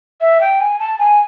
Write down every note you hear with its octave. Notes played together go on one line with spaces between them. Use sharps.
E5
G5
G#5
A5
G#5